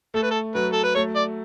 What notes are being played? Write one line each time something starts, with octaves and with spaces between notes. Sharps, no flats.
A3 A4
B4
A4
F#3 B4
A4
B4
A3 C#5
D5